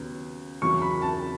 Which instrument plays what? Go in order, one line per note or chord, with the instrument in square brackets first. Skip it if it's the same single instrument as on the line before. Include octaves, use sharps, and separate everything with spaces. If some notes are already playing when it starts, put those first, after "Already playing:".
Already playing: [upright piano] D#2 C#3 F#3 B3
E2 C#3 F#3 C#6
B5
A5